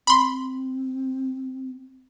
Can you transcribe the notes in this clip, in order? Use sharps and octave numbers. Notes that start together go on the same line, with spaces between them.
C4 B5 C6